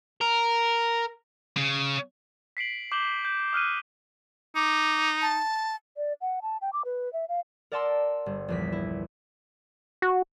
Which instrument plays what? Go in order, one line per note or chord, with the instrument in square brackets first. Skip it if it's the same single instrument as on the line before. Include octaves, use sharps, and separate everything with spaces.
[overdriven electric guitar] A#4
[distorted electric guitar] C#3
[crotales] B6 C7 D7 F#7
D6 G6 E7 F#7 G7
G6
D#6 F6 F#6 D#7
[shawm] D#4 [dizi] D6
[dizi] A5
[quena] D5
F#5
A5
G5
D6
B4
E5
F5
[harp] A#4 D5 F#5 A5 C6 E6
G1
A#1 E2 B6
E4
[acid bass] F#4